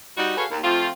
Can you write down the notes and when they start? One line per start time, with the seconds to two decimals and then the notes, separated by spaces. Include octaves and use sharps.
0.17 G3 D#4 F#4
0.37 F#4 G#4 A4 B4 C#5 F5
0.50 D#2
0.64 F3 A3 C4 F4